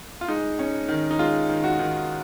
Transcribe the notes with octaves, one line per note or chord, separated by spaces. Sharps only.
F4
G#3 D#4
C#4
D#3
D#4
G#3 F4
D#3
F#4
D#3